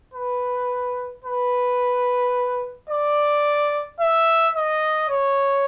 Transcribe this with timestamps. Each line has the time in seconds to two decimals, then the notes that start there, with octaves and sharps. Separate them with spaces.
0.14 B4
1.24 B4
2.90 D5
4.00 E5
4.56 D#5
5.09 C#5